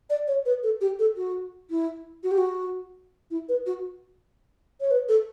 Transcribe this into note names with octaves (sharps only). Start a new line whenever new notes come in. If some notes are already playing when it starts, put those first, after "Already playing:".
D5
C#5
B4
A4
G4
A4
F#4
E4
F#4
G4
F#4
E4
B4
F#4
C#5
B4
A4